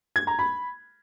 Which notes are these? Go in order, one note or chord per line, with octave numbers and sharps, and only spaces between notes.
G#6
A#5
B5